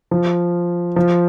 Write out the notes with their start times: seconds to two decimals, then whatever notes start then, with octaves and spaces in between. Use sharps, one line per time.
0.11 F3
0.96 F3